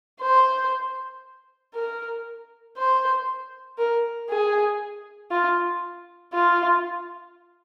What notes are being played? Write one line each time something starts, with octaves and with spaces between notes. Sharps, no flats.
C5
A#4
C5
A#4
G#4
F4
F4